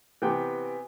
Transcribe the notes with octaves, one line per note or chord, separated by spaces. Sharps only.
C3 E3 B3 G5